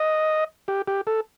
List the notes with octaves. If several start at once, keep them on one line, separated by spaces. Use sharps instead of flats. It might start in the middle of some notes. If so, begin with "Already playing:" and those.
Already playing: D#5
G4
G4
A4